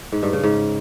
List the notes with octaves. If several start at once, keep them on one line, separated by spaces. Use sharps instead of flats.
G#2
G2
C#3
G#2